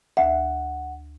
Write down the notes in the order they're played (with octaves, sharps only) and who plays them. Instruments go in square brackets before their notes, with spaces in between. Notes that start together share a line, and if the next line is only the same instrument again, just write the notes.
[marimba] D2 E5 [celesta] F#5